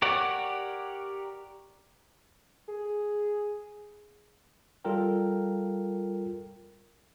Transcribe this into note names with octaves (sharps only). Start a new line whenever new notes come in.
G4 A#4 C#5 D5 F#5
G#4
G3 F4 A4 A#4 G5